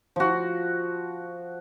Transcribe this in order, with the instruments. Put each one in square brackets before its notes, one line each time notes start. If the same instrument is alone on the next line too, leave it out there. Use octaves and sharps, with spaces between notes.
[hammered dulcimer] F3 F#4